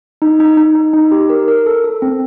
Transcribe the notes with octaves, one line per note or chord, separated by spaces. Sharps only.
D#4
D#4
D#4
D#4
D#4
G4
A#4
A#4
A4
A4
C4